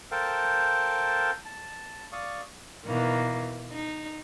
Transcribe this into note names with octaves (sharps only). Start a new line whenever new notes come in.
A4 A#4 C5 F5 G5 A5
A5
D5 F5 C#6 D#6
B2 D#3 E3 A#3
D#4